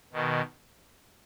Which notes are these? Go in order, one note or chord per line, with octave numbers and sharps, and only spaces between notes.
B2 D#3